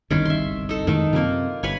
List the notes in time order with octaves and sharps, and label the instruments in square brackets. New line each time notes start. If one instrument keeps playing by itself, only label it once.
[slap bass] G1 C2 F#2 [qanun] D#3 C#4
[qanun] E5 C6
D#4 A4
[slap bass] F2 A2 G#3 [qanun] D#3 D#4
[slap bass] F#2 C3 C4 [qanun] A#3 F4
[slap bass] G1 C3 [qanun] B4 C#5 G#5